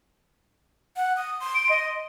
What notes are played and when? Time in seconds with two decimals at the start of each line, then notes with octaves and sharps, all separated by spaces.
0.96 F#5
1.17 D#6
1.40 C6
1.55 D7
1.69 D#5